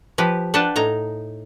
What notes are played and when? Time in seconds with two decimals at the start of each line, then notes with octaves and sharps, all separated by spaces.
0.18 F3 G4 B4
0.54 D4 B4 F#5 G5 A5
0.76 A2 D#4 A#5